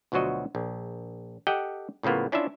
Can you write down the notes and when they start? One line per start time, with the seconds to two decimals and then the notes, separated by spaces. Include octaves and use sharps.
0.12 D2 B2 F3 F#3 F#4 D#5
0.55 A#1
1.47 G4 A4 D#5 F#5 G5
2.03 A2 C#3 F3 A#3 B3
2.32 C#4 D4 E4 F4 E5 A5